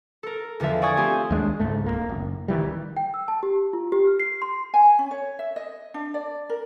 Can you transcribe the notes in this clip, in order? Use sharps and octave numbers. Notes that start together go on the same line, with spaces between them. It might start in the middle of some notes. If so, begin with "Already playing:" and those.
A4 A#4
E2 D3 F3 F4 E5
D5 G5 G#5 C#6 D#6 G#6
A3 C4 F4 G4 C5 G#5
D#2 G#3 A#3 D4
C#2 G#2 A3
D1 C#2 A#3
F#1
D1 D#3 E3 G3
G5
E6
A5
G4
F4
G4
F6
C7
C6
G#5
C#4
C#5
E5
D#5
D4
D5
A#4